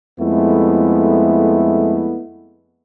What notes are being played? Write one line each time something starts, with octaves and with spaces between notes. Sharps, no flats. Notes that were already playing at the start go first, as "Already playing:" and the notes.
F2 G#3 A3 B3 E4